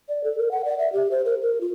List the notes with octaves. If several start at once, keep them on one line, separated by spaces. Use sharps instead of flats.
D5
A4
A#4
F#5
D5
E5
G4
C5
A#4
A#4
F4